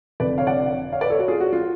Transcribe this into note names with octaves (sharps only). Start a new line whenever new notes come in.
F1 F2 D3 B4 D5
C#5 F5
D5 F#5
C#5 F5
B4 D5
A4 C#5
F#4
F4 G#4
F#4
F4